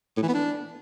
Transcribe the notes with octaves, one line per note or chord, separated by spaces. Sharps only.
A2
E3
B3
D4